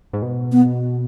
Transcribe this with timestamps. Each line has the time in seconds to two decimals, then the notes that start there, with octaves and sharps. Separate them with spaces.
0.13 G#2
0.22 B2
0.52 B3